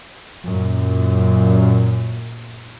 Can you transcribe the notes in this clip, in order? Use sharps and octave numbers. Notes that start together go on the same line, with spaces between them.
F#2 A#2